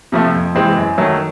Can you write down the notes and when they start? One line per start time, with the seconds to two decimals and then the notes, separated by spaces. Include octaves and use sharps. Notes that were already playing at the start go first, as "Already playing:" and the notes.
0.12 C3 F3 A3
0.34 F2
0.55 C3 E3 G#3 C4
0.76 F#2
0.98 D#3 F#3 A3